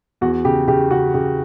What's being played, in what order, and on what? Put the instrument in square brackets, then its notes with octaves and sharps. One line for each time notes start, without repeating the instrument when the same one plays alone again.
[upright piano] E2 F#4
C#3 G4
C#3 G4
C#3 F#4
C#3 G4